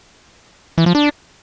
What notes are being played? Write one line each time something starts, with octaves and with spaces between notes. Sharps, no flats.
E3
F3
D4